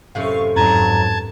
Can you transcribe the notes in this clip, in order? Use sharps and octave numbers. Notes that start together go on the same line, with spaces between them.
F#2 A2 C3 F5 C#6
F2 G#2 F#3 B4 A5 A#5 G#6